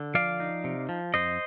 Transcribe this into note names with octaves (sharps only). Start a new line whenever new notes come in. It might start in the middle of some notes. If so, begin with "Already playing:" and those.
Already playing: D3
F3 D5 F5
D#4
C3
F3
F2 C5 D#5